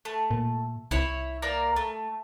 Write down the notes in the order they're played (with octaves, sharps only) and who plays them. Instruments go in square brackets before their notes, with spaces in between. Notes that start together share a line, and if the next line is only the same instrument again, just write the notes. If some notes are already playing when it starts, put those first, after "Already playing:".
[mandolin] A3
[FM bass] A#2
[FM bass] C2 [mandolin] E4 C#5
[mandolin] A#3 A#4 D5
A3